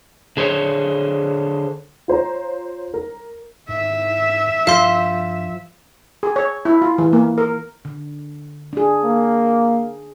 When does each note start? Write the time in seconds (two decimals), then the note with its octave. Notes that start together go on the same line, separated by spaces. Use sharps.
0.37 D3 G#4 C5 C#5
2.08 F4 C5 C#5 A#5
2.94 A#4
3.69 G#2 E5
4.67 G2 F3 F5 C6
6.23 G#4
6.36 C#5
6.65 E4
6.82 F4
6.98 E3
7.13 A#3
7.38 A#4
7.85 D3
8.73 D4 G#4
9.04 A#3